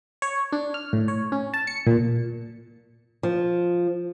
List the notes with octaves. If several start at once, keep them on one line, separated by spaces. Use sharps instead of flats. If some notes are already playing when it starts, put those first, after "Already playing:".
C#5
D4
F6
A2
C#5
C#4
A5
C#7
A#2
F3